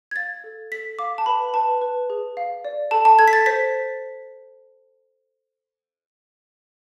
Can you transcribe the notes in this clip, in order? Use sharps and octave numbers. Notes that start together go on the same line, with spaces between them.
G#6
F5 A6
A4
A4 B6
F5 D6
A5
B4 B5
B4 A5
B4
G#4
F5
D5
A4 A5
A5
A4 G#6
B6
A6
C5 B6